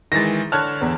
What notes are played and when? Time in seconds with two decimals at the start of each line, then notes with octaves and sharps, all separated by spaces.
0.12 D#3 E3 G#3 A6 A#6
0.52 D3 C#5 A5 F6 F#6 G#6
0.81 E2